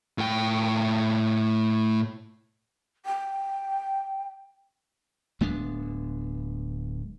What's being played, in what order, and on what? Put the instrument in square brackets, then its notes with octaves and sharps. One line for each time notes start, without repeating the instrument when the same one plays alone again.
[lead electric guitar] A2 G5
[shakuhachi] G5
[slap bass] D1 G#3 B3 D4